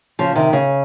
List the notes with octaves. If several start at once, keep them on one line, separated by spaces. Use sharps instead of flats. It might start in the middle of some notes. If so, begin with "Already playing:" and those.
C#3 F3
C3 D#3
C#3